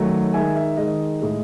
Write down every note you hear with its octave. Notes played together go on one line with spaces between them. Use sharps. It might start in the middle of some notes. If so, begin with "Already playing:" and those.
Already playing: D#3 F#3 A3
D#3 G#3 E5 G#5
E5
D#3 G#3 D#5
A2 G#3